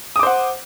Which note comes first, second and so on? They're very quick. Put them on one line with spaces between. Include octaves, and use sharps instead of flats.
D#6 D6 C5 F#5